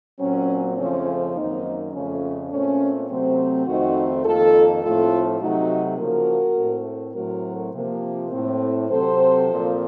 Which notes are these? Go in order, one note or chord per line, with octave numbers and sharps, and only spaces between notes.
A#2 F#3 C4 C#4
F2 C#3 F3 A3 C4 C#4
F#2 D#3 A#3 C4 D#4
F2 C#3 F3 A3 C#4
A#2 A3 C4 C#4
C3 F#3 A3 C4
F2 D#3 A3 C4 D#4 F#4
F2 D#3 A#3 F4 A4
A2 F3 A3 C4 F4 A4
C3 F#3 A3 D#4 F#4
C#3 F3 A#3 F#4 A#4
A2 A3 C4
A2 F#3 A3 C4 F#4 A#4
C3 F3 A#3
A2 A3 C4
C3 F#3 C4 A4 C5
A#2 F3 C4